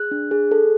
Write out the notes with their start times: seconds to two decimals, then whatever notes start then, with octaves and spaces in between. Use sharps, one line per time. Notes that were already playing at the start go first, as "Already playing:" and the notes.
Already playing: G#4 F#6
0.11 D4
0.31 G#4
0.51 A4